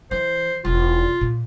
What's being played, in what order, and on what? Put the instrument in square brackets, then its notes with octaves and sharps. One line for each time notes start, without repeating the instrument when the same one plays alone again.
[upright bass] E3 [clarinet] C5
[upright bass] E1 [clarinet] F4
[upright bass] A#2